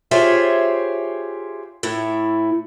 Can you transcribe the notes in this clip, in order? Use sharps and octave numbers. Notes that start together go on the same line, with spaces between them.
F4 G4 G#4 C5 C#5 E5
A2 E4